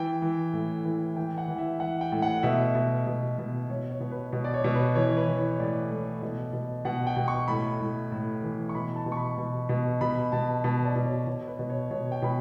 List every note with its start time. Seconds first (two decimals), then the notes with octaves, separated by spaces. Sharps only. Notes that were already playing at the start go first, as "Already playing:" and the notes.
Already playing: E3 G5
0.22 E3
0.53 A2
0.85 E3
1.16 E3 G5
1.38 F#5
1.48 E3
1.58 E5
1.80 E3 F#5
2.01 G5
2.12 A2
2.22 F#5
2.43 B2 E5
2.75 B2
3.07 B2
3.38 B2
3.69 B2 C#5
3.91 C#5
4.00 B2
4.11 B4
4.33 B2
4.44 D5
4.54 C#5
4.64 B2
4.75 B4
4.95 E3 C#5
5.17 B4
5.27 E3
5.38 C#5
5.59 A2 D5
5.90 A2
6.22 B2
6.53 B2
6.85 B2 F#5
7.07 G5
7.16 B2
7.28 C#6
7.48 A2 B5
7.80 A2
8.12 A2
8.42 E3
8.69 C#6
8.75 B2 B5
8.96 A5
9.06 B2
9.12 C#6
9.17 B5
9.38 B2
9.69 B2
10.01 B2 B5
10.32 B2 A5
10.64 B2 A5
10.85 D5
10.96 B2
11.05 C#5
11.27 B2 C#5
11.48 B4
11.59 B2
11.70 C#5
11.91 B2 C#5
12.12 G5
12.22 B2 B5